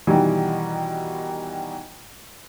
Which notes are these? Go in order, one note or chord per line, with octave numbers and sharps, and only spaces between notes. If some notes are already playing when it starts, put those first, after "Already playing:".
B2 D#3 E3 G3